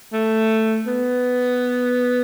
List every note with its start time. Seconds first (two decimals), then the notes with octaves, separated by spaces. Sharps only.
0.13 A3
0.87 B3